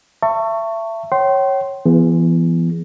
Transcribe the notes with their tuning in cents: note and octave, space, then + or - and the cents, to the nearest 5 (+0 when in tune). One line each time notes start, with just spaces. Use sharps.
E5 +25 A5 +35 C#6 +0
C#5 -15 G5 -40 C6 +0
E3 +35 B3 +0 G#4 +0